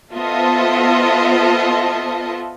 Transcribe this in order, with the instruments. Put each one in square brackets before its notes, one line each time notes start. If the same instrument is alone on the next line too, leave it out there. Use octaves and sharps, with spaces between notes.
[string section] B3 F4 A4 C5 D#5 E5